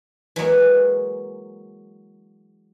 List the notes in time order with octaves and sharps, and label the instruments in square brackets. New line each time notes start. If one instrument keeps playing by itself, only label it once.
[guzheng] E3 F#3 G#3 A#3